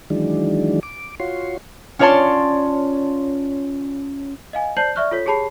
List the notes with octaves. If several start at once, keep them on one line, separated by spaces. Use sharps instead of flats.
D#3 E3 F#3 G#3 D4
D6
F4 F#4 C#5 C6
C#4 F4 C#5 D5 A5 C6
D#5 F5 G#5
C5 D5 A5 G6 C7 F#7
D5 E5 C#6 F6 F#6
F4 A4 C#5 B6
G4 G#4 C#5 A5 B5 C7